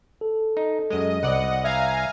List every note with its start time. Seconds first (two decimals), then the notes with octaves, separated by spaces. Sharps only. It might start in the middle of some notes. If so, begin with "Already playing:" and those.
0.21 A4
0.57 D#4
0.90 F#2 G#3 D#5
1.23 C2 D5 D#5 F#5
1.64 E5 F5 G#5 A#5